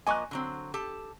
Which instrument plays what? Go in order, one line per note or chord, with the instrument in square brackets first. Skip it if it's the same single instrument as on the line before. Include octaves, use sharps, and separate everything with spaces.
[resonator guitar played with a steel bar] F3 A#3 D#5 [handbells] G#5 C#6 F#6
[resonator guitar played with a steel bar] D3 F#3 C4
G4 A4 A5